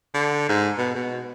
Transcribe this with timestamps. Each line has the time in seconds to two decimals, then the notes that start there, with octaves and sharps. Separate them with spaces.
0.14 D3
0.49 G#2
0.78 B2
0.95 B2